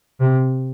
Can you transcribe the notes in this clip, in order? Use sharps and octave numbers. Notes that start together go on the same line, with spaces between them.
C3